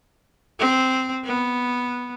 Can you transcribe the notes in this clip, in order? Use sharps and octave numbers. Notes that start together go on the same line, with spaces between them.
C4
B3